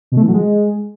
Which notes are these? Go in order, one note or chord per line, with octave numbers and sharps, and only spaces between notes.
B2
A3
E3
F#3
G#3